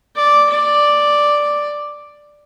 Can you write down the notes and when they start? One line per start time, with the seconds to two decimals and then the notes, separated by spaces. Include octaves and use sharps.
0.16 D5
0.50 D5